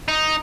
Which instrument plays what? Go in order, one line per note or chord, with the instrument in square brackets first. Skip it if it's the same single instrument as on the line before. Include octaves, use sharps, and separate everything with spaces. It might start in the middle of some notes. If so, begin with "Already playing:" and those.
[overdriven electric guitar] D#4